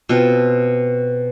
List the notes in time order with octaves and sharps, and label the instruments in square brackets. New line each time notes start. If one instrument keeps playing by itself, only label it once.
[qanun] B2 C4 F4